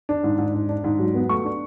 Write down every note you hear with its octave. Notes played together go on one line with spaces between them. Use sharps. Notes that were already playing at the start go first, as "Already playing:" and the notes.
D4
G#2
G#2
D4
D4
G#2
F#3
B3
A3 C#6
D4